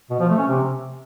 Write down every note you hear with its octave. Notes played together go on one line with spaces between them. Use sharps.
B2
F3
A3
C#4
C3